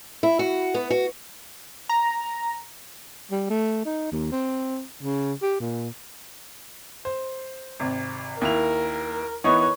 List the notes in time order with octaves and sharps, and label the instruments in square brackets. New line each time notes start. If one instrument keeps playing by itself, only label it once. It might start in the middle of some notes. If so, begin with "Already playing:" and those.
[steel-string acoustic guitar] E4
F#4
B3
F#4
[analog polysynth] A#5
[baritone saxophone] G3
A3
D#4
D#2
C4
C#3
G4
A#2
[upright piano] C5
G#1 C3
[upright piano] D#2 E4 F7 [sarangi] A#4
[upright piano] E3 B3 D#4 [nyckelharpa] B4 C#5